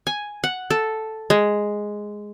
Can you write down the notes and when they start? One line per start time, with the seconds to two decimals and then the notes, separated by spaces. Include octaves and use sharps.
0.07 G#5
0.44 F#5
0.71 A4
1.30 G#3